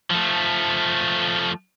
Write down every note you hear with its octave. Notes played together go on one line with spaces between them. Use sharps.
F3 A3